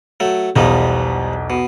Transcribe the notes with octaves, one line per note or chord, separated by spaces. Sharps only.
F#3 A3
B1 E2 F3 G3 D#4
B2